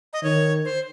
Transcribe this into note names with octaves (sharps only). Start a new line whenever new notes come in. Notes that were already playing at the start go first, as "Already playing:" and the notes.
D#5
D#3 C#5
C5